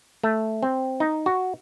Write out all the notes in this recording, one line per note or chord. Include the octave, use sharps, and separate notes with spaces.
A3
C4
D#4
F#4